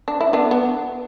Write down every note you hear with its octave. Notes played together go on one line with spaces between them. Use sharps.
D4
E4
B3 D4
B3